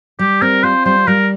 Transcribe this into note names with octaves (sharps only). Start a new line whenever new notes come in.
G3 G4
C4 A#4
F4 C5
G3 C5
G3 A#4